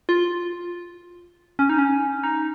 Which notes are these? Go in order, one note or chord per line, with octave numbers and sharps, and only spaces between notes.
F4
C#4
D#4
C#4
D#4